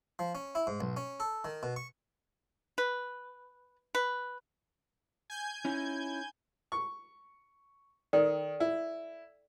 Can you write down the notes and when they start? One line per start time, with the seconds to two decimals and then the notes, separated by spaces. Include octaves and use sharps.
0.19 F3
0.35 C#4
0.55 E4
0.67 G#2
0.81 B1
0.97 C#4
1.20 A4
1.44 D#3
1.63 B2
1.76 C#6
2.78 B4
3.95 B4
5.30 G#5 G6 G#6
5.65 C#4 D#4 E4
6.72 C#6
8.13 D#3 A4 D5 G5
8.60 E4